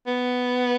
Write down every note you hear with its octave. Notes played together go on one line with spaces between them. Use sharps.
B3